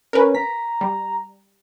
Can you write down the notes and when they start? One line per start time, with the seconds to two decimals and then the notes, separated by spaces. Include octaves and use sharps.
0.13 C#4 A#4 B4
0.35 A#5 B6
0.81 G3